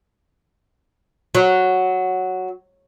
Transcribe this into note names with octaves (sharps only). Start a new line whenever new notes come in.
F#3